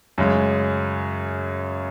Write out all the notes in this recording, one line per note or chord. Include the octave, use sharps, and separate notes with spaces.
F#2 C#3 G#3